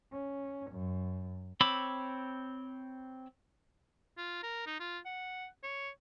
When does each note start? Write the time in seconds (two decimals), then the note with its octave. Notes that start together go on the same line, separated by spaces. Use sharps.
0.12 C#4
0.71 F#2
1.61 C4 C#5 B5 D6 E6
4.18 F4
4.43 A#4
4.67 D#4
4.80 F4
5.05 F#5
5.63 C#5